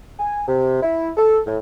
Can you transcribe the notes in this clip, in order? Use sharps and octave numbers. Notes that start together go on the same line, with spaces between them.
G#5
C3
E4
A4
A2